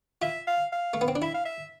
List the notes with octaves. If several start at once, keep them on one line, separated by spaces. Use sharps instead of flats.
F4 E5
F5
F5
A3
B3
C4
D4
E4 E5
F5
E5